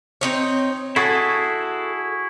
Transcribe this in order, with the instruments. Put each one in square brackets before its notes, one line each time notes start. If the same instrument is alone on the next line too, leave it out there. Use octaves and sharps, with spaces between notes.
[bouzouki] C4 D#4 C#5
[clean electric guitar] E4 F#4 G#4 [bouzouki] A4